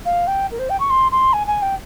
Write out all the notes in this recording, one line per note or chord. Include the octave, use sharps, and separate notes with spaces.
F5
G5
A#4
C5
G5
C#6
C6
C6
G#5
G#5
G5